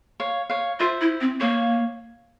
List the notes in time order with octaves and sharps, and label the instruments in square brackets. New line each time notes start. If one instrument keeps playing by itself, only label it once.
[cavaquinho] C#5 F5
C#5 F5
[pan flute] F4 [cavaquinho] C5 E5
[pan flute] E4
C4
[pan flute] A#3 [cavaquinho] C#5 F5